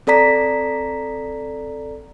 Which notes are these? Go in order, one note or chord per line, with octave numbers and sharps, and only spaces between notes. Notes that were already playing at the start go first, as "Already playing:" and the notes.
C4 A4 D5 A#5 B6